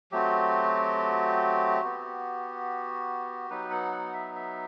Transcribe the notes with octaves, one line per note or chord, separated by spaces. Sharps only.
F#3 A3 C4 F#4 G4
B3 F#4
F#3 B3 D#4 B4
F#5
F#5
E5
E5